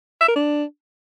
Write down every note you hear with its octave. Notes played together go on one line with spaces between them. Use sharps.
E5
A#4
D4